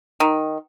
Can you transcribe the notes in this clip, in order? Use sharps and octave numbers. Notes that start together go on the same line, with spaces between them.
D#3